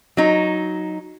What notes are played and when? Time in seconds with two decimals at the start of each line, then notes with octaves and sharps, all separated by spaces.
0.17 F#3 D#4